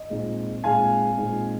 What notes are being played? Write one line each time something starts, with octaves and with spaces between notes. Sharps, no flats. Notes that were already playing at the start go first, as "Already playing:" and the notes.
Already playing: D#5
A#2 G#3 C4 D#4
A#2 G#3 C4 D#4 F5 G#5
A#2 G#3 C4 D#4